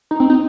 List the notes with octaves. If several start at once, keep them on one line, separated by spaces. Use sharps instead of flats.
D#4
C4
D#4